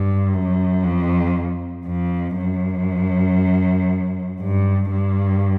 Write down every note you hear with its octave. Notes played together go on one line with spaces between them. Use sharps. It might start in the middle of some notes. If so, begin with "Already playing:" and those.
Already playing: G2
F#2
F2
F2
F#2
G2
G2